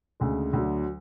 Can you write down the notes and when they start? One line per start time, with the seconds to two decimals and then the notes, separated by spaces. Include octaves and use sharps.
0.20 D2 C#3 G#3
0.53 D2 D3 F#3